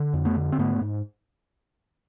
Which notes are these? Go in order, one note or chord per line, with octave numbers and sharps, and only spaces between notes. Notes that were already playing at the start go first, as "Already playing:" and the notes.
Already playing: D3
F2
A3 B3
D3
C4
G#2 A3 B3
G#2